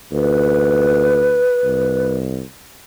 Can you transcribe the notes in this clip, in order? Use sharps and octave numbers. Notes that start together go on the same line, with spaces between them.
D2 B4
C2